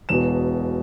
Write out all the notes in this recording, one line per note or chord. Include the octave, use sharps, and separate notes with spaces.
E1 E2 B2 E7